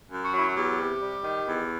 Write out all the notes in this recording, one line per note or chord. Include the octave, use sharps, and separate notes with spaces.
F#2
F#4
F#3 E4
F#4
E2 G4
C3
G3
D#3
E2